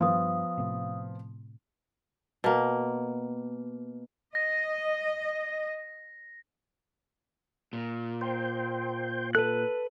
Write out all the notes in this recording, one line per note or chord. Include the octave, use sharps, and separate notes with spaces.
G2 F3 B3 F5 D#6
A2 C3
B2 A#3
D#5 A#6
A#2
C5 G5
A4 B4 F#6